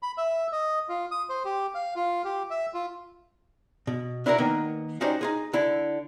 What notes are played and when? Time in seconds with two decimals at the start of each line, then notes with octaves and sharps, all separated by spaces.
0.02 B5
0.18 E5
0.52 D#5
0.89 F4
1.11 D#6
1.29 C5
1.45 G4
1.74 F5
1.96 F4
2.25 G4
2.50 E5
2.74 F4
3.87 B2
4.26 D4 E4 F#4 G4 A#4
4.38 D#3 A#3 B3
5.01 C#4 D#4 F#4 G4 C5 D5
5.21 D#4 F4 G#4
5.53 D3 E4